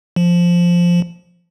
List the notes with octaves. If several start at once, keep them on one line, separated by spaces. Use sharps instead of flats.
F3